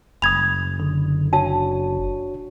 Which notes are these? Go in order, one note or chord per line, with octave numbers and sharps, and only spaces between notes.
F#1 B5 D#6 G#6 F7
D3
D4 F#4 C#5 A5